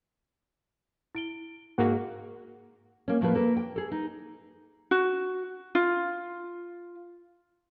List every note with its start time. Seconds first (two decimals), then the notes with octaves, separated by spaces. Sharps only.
1.15 E4 D7 G7
1.78 G#2 A#3 F#4 G#4 A#4 F#5
3.08 A#3 C#4
3.21 A2 F3 A3 A#3 B4
3.35 A#3 A4 B4
3.57 G5
3.76 G#4 A4
3.92 D#4
4.91 F#4
5.75 F4